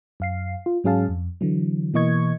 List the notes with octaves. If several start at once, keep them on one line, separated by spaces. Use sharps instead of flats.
F#2 F5 C7
F4
G#2 F#3 C#4 G#4 F5 A5
F2
D3 E3 F#3
B2 E3 A#3 D#5 C#6 G#6